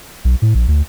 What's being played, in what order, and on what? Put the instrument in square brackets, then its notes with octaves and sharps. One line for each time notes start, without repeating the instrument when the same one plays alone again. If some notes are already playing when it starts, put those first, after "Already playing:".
[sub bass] B1
A2
A#1
D2